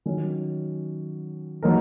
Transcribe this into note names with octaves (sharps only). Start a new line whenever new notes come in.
D#3 F#3 C#4
F#3 A#3 D#4 A#4